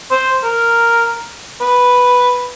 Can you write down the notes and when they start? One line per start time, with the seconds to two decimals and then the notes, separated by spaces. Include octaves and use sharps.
0.11 C5
0.44 A#4
1.61 B4